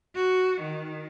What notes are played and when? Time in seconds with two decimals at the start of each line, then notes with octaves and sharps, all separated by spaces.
0.16 F#4
0.62 D#3